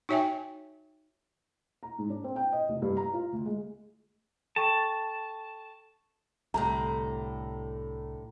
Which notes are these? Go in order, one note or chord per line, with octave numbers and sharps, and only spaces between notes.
D#4 F#4 C#5 E5 G5 G#5
A#5
G#2
D4
C4
G5
D#5
F1
G2
A#5
F4
D2
G#3
A4 G5 A5 C#6
C2 A2 D3 G3 A#5